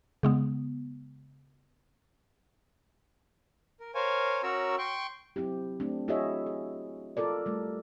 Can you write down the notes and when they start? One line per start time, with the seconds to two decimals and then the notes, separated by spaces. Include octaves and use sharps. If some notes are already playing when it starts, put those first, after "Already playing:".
0.23 C#3 G#3 B3
3.80 A#4
3.95 A#4 C5 C#5 F5 G#5
4.43 C#4 F#4 A#4 C#5 A#5 E6
4.78 G5 C6 C#6
5.36 F#3 C4 E4 G4
5.80 A3 C4 D4
6.08 E4 F#4 G#4 C#5 D#5 E5
6.46 G#4
7.17 F4 A4 A#4 D5
7.46 G3 A3